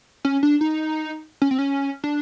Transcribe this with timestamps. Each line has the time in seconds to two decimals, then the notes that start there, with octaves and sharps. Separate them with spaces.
0.25 C#4
0.43 D4
0.61 D#4
1.42 C#4
1.51 C4
1.59 C#4
2.04 D4